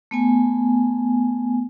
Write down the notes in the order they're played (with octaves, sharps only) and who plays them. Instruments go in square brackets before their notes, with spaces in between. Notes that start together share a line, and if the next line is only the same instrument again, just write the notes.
[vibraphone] A3 B3 G#5